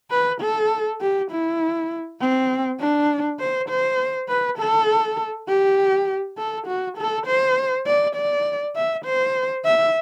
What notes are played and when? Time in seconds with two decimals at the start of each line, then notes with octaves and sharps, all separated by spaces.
0.11 B4
0.41 A4
1.01 G4
1.31 E4
2.20 C4
2.80 D4
3.40 C5
3.69 C5
4.28 B4
4.58 A4
5.48 G4
6.37 A4
6.67 F#4
6.97 A4
7.26 C5
7.86 D5
8.15 D5
8.75 E5
9.05 C5
9.65 E5